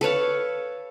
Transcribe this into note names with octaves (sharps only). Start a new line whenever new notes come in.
A4 B4 C#5 F5